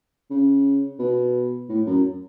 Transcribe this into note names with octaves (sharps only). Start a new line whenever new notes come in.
C#3
B2
A2
F#2